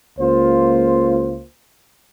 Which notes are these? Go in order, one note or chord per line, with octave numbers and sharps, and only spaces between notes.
C#2 A#3 F4 C5